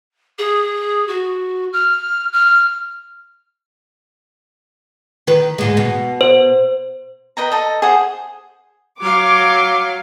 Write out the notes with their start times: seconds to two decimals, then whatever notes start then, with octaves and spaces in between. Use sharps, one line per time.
0.38 G#4
1.07 F#4
1.72 F6
2.32 F6
5.27 D#3 B4
5.58 D2 G#2 G#3
5.77 B2
6.21 C5
7.37 B4 D#5 G5 A#5
7.52 A4 D#5
7.82 G#4 C5 F#5 D#6
9.01 F#3 F5 D6